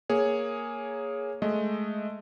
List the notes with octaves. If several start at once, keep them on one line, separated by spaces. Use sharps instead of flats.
A#3 G#4 C#5
G#3 A3 D#5